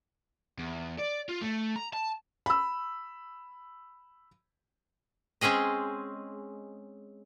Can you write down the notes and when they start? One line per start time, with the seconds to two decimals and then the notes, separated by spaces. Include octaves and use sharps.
0.59 E2
0.99 D5
1.29 F4
1.41 A3
1.76 A#5
1.93 A5
2.46 B5 E6
5.41 G#3 C4 C#4 G#4 D#5